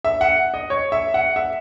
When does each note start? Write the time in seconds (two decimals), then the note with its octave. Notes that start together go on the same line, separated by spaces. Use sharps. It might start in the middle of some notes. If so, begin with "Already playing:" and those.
0.05 E5
0.21 F#5
0.54 D#5
0.70 C#5
0.92 E5
1.14 F#5
1.36 E5